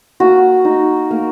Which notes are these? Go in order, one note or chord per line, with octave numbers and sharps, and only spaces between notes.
A#3 F#4
D#4
A#3